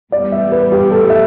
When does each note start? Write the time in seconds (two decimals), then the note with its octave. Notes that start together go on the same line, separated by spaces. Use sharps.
0.12 A2 E3 G3 B3 D5
0.32 E5
0.52 B4
0.72 G4
0.91 A4
1.10 E5